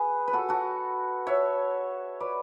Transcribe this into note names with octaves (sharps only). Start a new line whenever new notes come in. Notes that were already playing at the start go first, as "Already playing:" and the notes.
Already playing: G#4 B4
B4
F#4 A4
F#4 A4
C#5 E5
B4 D5